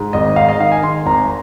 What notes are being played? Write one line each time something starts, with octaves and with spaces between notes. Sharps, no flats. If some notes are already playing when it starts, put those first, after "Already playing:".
Already playing: G#2
G#1 D#5
G#2 F5
D#5
D#3 F5
G#5
D#3 C6
G#1 A#5